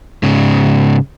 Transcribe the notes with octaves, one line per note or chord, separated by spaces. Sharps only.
G#2 C#3